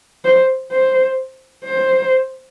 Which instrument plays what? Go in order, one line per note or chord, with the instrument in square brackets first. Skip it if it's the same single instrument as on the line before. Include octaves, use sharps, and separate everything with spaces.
[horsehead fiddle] C5
C5
C5